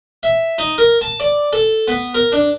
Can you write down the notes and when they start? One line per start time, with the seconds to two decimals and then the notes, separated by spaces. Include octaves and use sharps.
0.23 E5
0.58 D#4
0.78 A#4
1.01 A5
1.20 D5
1.53 A4
1.88 B3
2.14 A#4
2.32 D4